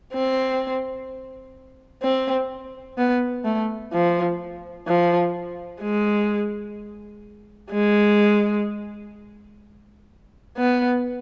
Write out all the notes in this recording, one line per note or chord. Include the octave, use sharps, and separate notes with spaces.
C4
C4
B3
A3
F3
F3
G#3
G#3
B3